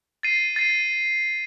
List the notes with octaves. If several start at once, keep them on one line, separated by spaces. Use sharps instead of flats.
A6 C7 D#7
A6 C7 D#7